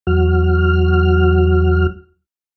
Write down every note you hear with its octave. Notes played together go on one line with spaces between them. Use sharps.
E2 F#3 F#4 F6